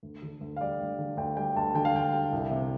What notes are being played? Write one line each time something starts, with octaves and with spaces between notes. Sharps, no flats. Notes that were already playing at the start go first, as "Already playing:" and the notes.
D2
D3
D2
F5
G3 D5
D2
D3
D2 G5
G3 G5
D2 A5
D3 G5
F5
D2 G5
G3
C2
C3